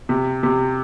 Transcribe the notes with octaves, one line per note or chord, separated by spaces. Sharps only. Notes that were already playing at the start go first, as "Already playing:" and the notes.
C3
C3